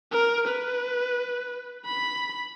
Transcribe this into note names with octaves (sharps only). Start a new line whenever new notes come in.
A#4
B4
B5